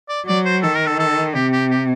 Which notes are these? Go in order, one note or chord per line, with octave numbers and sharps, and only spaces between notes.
D5
F#3 D5
C5
D#3 A4
A#4
A4
A4
C3 G4
G4
G4